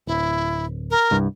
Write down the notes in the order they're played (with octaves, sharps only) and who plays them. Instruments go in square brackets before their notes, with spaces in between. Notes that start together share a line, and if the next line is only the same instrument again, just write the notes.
[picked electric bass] D1 [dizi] E4
[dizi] A#4
[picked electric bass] C2 G2